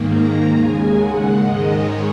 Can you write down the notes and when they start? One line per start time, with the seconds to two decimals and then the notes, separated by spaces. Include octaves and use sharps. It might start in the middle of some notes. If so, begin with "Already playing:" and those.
Already playing: G#2 D#3 A#3
0.11 A#5
0.54 D#2 C#3 G#3 G#5
0.96 F#5
1.39 G#2 D#3 G#3 D#5
1.81 C#5